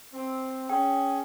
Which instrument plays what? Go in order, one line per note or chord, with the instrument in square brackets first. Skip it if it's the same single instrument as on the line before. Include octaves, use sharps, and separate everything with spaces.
[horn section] C4
[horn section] C#4 G#4 [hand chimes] G5